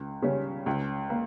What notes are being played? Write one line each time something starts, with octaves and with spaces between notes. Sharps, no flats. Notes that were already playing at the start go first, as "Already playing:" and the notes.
Already playing: C#2
C#3 G3 C#4
C#2
A#3